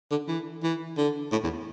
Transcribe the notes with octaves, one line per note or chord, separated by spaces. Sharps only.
D3
E3
E3
D3
A2
E2